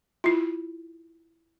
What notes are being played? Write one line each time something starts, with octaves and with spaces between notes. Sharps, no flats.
E4 F4